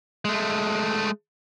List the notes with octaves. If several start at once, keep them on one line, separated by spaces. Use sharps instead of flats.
G#3 A3